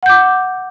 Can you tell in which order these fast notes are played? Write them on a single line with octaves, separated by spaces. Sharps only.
F#5 G6 D6